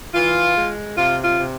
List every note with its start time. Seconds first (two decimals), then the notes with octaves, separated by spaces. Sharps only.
0.14 E3 F4
0.56 G#3
0.97 C3 F4
1.24 F4
1.38 C3